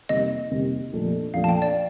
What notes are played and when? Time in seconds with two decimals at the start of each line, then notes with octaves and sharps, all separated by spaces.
0.09 C3 G3 A#3 D#4 G4 D#5
0.51 C3 G3 A#3 D#4 G4
0.93 A#2 F3 A3 D4
1.34 A#2 F3 A3 D4 F5
1.44 A5
1.49 G5
1.62 D5